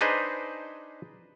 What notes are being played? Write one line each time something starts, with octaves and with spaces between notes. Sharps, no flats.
D4 D#4 G#4 B4 C5 D#5